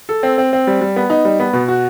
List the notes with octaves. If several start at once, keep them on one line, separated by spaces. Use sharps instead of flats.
A4
C4
C4
C4
G3
G3
B3
D#4
G3
B3
B2
F#4